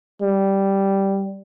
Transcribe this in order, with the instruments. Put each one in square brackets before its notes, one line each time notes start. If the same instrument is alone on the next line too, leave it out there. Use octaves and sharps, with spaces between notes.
[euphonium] G3